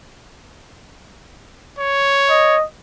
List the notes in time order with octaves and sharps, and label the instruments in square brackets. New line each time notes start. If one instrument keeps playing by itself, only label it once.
[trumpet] C#5
[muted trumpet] D#5